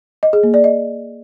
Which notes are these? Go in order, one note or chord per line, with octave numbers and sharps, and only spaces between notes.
D#5
G#4
A#3
D5
D#5